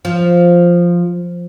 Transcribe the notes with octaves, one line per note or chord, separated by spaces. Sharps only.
F3